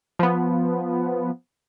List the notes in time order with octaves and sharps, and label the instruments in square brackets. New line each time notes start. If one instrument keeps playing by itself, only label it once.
[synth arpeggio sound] F3 B3